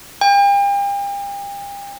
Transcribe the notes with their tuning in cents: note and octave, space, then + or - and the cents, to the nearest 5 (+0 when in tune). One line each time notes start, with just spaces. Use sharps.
G5 +40